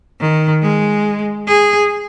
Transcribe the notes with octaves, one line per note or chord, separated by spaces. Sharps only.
D#3
G#3
G#4